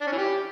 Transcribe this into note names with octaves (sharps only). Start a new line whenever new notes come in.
D4
C#4
E3
G4